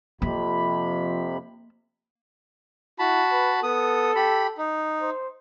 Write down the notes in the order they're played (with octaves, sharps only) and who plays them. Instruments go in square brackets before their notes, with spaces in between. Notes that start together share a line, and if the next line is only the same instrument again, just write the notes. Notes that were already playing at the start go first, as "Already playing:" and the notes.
[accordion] F2 C3 B5 [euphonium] F3 [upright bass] A#3
[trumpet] E4 [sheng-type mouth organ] F#4 A5 B5
[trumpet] B4
[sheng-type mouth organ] B3 D#6 [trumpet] A4
[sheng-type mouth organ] G4 B5
D#4
[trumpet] C5